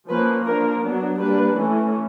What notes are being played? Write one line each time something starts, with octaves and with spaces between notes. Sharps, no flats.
F3 A#3 C#4 B4
F3 A#3 D4 A#4
F#3 B3 D4
G3 A#3 D4 B4
E3 A3 C#4